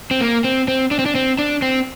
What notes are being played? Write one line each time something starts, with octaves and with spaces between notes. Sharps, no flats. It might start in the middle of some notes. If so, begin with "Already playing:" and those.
C4
A#3
C4
C4
D4
C4
D4
C4
D4
C4